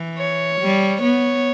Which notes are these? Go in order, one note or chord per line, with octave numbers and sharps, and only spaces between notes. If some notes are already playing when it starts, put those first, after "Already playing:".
Already playing: E3
C#5
G3
B3 C#5